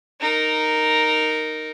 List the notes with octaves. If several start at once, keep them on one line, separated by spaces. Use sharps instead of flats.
D#4 A#4